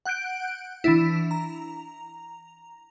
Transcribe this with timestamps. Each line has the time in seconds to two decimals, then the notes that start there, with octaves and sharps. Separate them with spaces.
0.05 F#5 F#6 G6 D7
0.84 E3 D4 E4
1.31 A#5